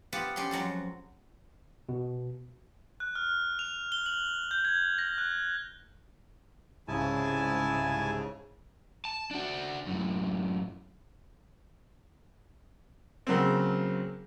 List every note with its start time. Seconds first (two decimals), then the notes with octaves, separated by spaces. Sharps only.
0.13 B3 F4 G4 B4 F#5 A5
0.36 C#4 G4 A4 C6
0.51 F2 F#3 G#3 A4
1.89 B2
3.00 F#6
3.15 F6
3.59 F7
3.92 G7
4.06 F#7
4.51 G6
4.65 G#6
4.98 A#6
5.18 F#6
6.88 C2 G#2 C#3 E4 G#5 A5
9.05 A5
9.31 D4 F#4
9.87 F#2 A2
13.27 C#3 F#3 A#3 C4